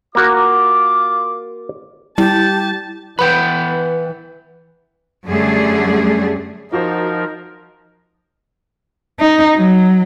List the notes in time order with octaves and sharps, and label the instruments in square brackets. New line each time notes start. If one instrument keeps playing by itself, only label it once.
[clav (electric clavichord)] A#3 F#4 A#4 [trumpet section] F4 D6
[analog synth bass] G3 [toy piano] E4 [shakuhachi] G4 [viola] A5
[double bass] E3 [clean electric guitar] B4 F#5 G5 [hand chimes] B5 G6
[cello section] F#2 D3 G3 A3 G#4
[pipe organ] F3 A#4 [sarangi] D#4 [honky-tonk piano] F4 F#4 C5
[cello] D#4
F#3